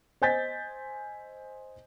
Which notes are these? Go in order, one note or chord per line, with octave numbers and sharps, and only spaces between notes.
C5 D#5 G#5 G6 A6 B6